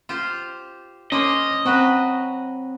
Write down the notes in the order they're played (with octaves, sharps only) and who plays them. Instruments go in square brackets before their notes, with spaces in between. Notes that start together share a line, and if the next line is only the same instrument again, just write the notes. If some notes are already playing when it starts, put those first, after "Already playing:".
[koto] F4 G4 C5
[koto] A#3 C5 C#5 [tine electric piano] C#4 C6 D6 [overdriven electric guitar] D#5
[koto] F#3 F#4 B4 [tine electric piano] C4